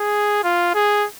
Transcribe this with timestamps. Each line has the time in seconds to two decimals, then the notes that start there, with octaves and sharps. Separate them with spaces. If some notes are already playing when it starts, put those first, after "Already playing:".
Already playing: G#4
0.44 F4
0.74 G#4